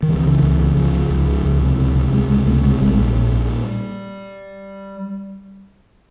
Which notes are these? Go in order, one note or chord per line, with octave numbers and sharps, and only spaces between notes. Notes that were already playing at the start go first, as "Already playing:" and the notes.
D#3
C#2 E3
C#3
C#2
C#3
C#2 F3
C#3
C#2
C#3
C#2
C3
C#2
C3
C#2 G#3
C3 G#3
C#2 A3
C3 G#3
A#1 G3
A#2
A#1
A#2